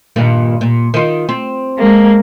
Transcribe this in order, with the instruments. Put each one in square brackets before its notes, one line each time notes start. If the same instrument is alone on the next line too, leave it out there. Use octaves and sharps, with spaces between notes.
[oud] G2 A#2 D#3
A#2
D#3 F4
C4
[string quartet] G#3 A#3